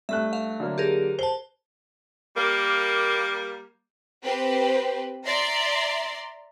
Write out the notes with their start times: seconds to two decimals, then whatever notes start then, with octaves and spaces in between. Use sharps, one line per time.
0.09 G2 A3 E5 F#6
0.33 E5 F5
0.60 D3 F#3 A#3
0.78 G4 G#4 A#4
1.19 C5 A5 G7
2.36 G3 A#3
4.22 C4 G4 B4 C5
5.25 D5 E5 A#5 C6